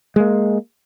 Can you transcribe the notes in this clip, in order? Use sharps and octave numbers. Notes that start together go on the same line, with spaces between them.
G#3 A#3